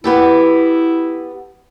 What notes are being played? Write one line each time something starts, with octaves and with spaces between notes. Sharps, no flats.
B3 E4 G4 A4